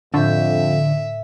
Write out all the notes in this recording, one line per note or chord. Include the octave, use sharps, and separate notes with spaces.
F2 A2 D3 E5 G6